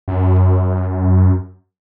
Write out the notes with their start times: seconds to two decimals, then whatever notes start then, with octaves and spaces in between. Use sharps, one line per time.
0.08 F#2